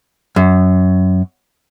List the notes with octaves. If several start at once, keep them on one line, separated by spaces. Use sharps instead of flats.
F#2